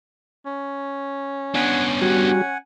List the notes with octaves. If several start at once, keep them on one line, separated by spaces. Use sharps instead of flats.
C#4
B3 D4 F#5 G#5
G3 F#4 F#5 G#5